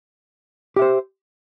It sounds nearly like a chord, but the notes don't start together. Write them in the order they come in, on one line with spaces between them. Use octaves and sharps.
G4 E5 C5